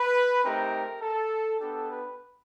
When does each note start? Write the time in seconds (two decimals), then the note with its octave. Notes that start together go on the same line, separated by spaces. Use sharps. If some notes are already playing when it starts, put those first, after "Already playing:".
Already playing: B4
0.44 A3 C4 D#4 G4 A#4
1.01 A4
1.60 B3 D4 G4 A4
1.90 B4